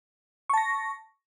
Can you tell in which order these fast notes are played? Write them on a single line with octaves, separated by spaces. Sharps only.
C#6 A5 A#6